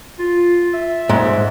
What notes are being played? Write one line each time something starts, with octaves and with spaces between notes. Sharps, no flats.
F4
E5
G#2